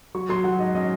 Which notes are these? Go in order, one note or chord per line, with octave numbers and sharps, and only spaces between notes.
F#3 C#6
F#3 C6
F#3 F#5
G#2 D#5
C#4 D#5